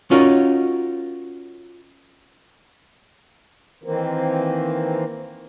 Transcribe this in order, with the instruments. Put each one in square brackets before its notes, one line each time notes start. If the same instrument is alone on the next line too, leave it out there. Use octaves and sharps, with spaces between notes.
[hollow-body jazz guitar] C#4 D#4 F4 F#4 A#4 C#5
[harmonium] D#3 E3 A#3 C4